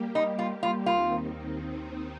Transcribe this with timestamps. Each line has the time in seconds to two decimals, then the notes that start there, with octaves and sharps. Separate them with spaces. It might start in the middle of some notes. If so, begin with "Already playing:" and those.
Already playing: G3 A#3 G4
0.15 D#4
0.39 F4
0.63 F4
0.86 D#2 D#3 C4 D#4 F4